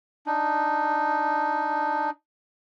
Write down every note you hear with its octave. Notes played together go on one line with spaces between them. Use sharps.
D4 D#4